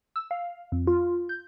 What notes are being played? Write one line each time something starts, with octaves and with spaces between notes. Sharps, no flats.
E6
F5
F2
F4
G6